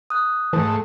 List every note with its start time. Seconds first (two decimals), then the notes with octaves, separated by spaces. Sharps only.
0.10 D#6 F#6
0.53 G#2 E3 A3